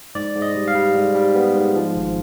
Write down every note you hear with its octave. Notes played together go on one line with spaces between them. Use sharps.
G#2 D5
G#2
D#5
G3
F5
G3
G#2
G3
B3
G#2
F3
G#1